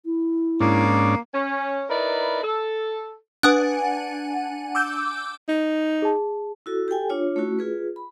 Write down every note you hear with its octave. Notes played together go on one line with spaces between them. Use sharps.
E4
G#2 A#3 C#4 D4
C#4
D#4 E4 A#4 B4 D5
A4
D4 B4 F#5 G#5 D#6 F#6
D6 E6 G6
D#4
G#4 A5
E4 F#4 A4
G4 A4 G5 G#5
D4 F4 C#5
A3 C#4 E4 F#4
F4 G#4 B4
B5